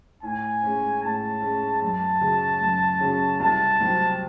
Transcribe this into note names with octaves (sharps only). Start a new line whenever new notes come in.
A2 G#5
G#3 C#4
A2 A5
G#3 C#4
F#2 A5
C#3 F#3 C#4 G#4
F#2
C#3 F#3 C#4 G#4
C2 A5
C3 F#3 C4